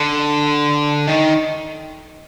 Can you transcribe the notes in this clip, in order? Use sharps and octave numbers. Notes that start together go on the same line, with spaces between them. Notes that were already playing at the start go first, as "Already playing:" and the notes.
Already playing: D3
D#3